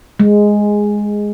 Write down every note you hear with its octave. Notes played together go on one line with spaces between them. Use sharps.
G#3